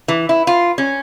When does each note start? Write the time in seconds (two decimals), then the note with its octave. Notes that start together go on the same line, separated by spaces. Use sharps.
0.08 E3
0.29 E4
0.47 F4
0.78 C#4